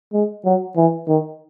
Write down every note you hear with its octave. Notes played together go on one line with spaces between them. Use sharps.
G#3
F#3
E3
D#3